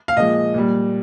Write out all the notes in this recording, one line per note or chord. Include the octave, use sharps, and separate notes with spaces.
F5
A#2 F3 G#3 D#5
A#2 G3